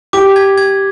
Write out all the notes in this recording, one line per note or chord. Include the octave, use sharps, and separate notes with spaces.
G4 D6
G#6
G#6